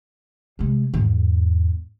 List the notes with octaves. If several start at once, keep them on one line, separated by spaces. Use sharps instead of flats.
C3 G#3
E2 G#2